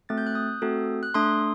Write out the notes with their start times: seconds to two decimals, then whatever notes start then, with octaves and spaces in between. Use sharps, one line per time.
0.09 A3 C4 F#4 A4 A6
0.18 G6
0.26 F#6
0.35 D#6 G6
0.62 A3 C4 F#4 A4
1.03 F#6
1.14 A3 D4 A4 C6 D#6